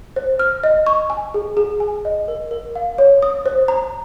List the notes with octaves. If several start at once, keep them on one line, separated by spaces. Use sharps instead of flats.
C5
F6
D#5
C#6
G#5
G#4
G#4
G#5
D#5
A#4
A#4
F5
C#5
D#6
C5
A#5